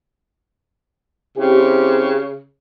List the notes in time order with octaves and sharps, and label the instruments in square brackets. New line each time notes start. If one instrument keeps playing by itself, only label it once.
[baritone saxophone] C#3 [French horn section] C4 E4 G4